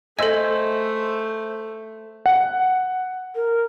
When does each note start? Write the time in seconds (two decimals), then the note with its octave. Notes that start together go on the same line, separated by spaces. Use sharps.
0.19 A3 A4 C5 D#5 E5 G#5
2.26 F#5
3.35 A#4